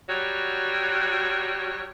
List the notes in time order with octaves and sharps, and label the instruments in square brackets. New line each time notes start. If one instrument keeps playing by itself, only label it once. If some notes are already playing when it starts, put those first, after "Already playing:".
[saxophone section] F#3 G3 F#4 C#5